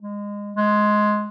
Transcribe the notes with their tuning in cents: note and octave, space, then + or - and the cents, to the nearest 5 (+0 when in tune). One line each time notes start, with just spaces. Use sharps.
G#3 -25
G#3 +15